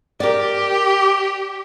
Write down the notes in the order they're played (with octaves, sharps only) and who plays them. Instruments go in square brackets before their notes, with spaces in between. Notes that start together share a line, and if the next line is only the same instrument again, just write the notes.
[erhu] G4 [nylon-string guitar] A#4 D5